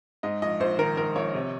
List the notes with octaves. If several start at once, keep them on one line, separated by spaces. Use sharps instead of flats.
G#2 D#5
A#1 D#5
A#1 C5
D#3 A#4
G#2 A#4
A#1 C#5
C3